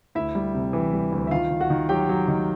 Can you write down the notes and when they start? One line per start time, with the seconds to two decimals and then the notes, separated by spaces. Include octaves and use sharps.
0.15 D2 E4 E5
0.35 G3
0.55 C3
0.73 E3
0.93 G3
1.12 D2
1.27 E5
1.31 D#3 F4 F5
1.51 D#3
1.60 F#4 F#5
1.70 D#3
1.89 F#3 G4 G5
2.09 F#3
2.28 D#3